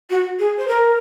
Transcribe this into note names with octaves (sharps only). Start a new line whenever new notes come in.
F#4
G#4
C5
A#4